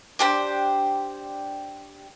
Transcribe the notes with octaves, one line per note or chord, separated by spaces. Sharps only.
D4 G4 C5